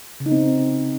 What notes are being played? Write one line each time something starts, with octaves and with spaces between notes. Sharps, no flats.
C#3
D#4
C4